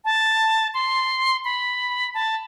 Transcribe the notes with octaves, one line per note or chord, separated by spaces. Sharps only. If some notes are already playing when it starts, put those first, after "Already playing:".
A5
C6
B5
A5